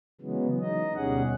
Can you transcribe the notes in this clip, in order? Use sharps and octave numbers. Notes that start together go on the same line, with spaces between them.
C#3 E3 F#3 G#3 B3
D#4 D#5
D2 B2 G3 C#4 G#4 F#5